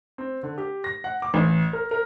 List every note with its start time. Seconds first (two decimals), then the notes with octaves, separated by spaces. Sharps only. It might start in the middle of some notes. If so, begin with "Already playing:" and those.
0.18 C4
0.43 D3
0.58 G4
0.84 A#6
1.04 F#5
1.22 D6
1.34 A1
1.73 A#4
1.91 A#4